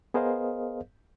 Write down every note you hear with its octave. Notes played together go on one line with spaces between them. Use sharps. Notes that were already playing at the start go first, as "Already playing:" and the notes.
B3 G#4 A#4 C5 D#5 F5